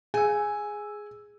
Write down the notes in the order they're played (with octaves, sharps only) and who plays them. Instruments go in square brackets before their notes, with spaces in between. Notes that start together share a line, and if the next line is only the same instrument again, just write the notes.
[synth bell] G#4 E6 [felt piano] G#5